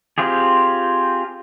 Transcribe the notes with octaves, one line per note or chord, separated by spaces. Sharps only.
C4 F4 G4 G#4